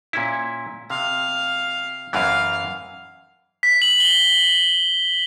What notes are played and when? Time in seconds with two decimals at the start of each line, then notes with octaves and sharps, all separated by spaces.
0.13 A#2 C#4 E4
0.90 C3 F5
2.13 F#2 E3 F5
3.63 B6
3.82 F#7
4.00 G7